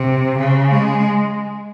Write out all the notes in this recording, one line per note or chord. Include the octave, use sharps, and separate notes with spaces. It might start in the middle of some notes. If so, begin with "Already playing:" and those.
Already playing: C3
C#3
G#3